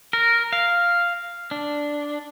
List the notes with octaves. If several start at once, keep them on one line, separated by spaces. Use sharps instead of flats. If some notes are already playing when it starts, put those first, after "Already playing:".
A#4
F5
D4